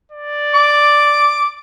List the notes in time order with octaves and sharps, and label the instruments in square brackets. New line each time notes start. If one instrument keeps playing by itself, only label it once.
[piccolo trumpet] D5
[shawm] D6